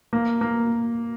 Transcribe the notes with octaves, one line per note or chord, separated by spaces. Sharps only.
A#3
A#3